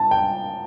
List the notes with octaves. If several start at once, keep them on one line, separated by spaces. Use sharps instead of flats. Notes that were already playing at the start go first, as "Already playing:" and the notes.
Already playing: A5
G5